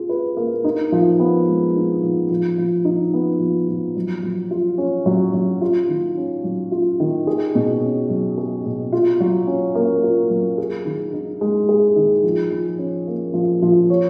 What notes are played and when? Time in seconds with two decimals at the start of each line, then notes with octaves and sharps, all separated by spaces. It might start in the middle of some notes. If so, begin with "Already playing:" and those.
Already playing: F4 G#4
0.09 B4
0.37 A#3
0.64 D#4
0.92 F3
1.19 B3
1.48 G#3
1.75 D#4
2.03 F3
2.30 F3
2.58 F3
2.85 D#4
3.14 B3
3.40 F3
3.68 F3
3.96 F#3
4.23 F#3
4.51 F4
4.78 C#4
5.06 F#3
5.34 F#3
5.61 F4
5.89 D#3
6.17 C#4
6.44 F#3
6.72 F4
7.00 D#3
7.27 G#4
7.55 B2
7.82 C#4
8.10 F#3
8.38 G#4
8.65 B2
8.92 F4
9.20 F#3
9.47 C#4
9.75 A#3
10.03 F4
10.30 F#3
10.58 G#4
10.85 D#3
11.13 D#4
11.41 G#3
11.69 G#4
11.96 D#3
12.24 F3
12.51 F3
12.78 C#4
13.07 A#3
13.34 F3
13.62 F3
13.90 C#5